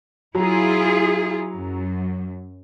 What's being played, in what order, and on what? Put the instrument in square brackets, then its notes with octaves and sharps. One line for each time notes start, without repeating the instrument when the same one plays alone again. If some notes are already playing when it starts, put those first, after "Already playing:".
[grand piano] F#3 A#5 [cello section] E4 F4 G#4
[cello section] F#2